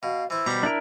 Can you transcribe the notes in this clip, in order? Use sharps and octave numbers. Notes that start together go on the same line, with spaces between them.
B2 F5
E3 E4 C5
B2 G3 A#5 B5
D4 E4 A#4